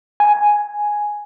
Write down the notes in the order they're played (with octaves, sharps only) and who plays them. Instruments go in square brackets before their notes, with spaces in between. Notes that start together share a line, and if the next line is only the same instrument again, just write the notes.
[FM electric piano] G#5